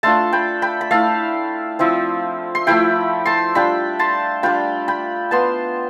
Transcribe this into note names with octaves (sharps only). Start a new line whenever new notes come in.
A3 D4 F4 A5 C6
G5 B5
G5 B5
B5
A3 E4 F5 A5
F3 C4 E4
C6
F3 A3 E4 G5 B5
A5 C6
G3 D4 F4 G5 B5
A5 C6
G3 D4 F4 G5 B5
G5 B5
B3 F4 A5 C6